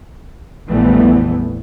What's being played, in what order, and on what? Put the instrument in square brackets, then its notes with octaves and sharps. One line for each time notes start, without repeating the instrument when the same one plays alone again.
[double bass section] A#1 F2 E3 G3 A3 B3